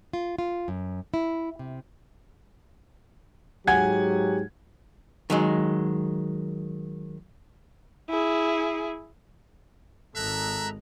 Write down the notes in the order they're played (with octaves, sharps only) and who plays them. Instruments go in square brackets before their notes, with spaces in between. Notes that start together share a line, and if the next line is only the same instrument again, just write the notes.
[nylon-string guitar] F4
F4
F#2
E4
C3
[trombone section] G#2 F#3 G4 [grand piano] F#5 G#5 G#6
[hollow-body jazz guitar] D#3 F#3 G#3
[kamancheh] E4 G#4
[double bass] G#1 G#3 [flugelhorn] A4 [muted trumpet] E5 [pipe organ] A#5 F#6